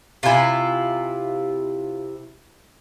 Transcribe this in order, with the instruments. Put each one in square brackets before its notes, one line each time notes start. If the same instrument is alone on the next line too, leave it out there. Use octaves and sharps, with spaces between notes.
[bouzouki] C3 E4 [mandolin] F4 G#5